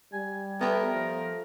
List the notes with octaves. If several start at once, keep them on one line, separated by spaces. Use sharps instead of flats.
G3 G#5
A3 B3 A#4 G5
F3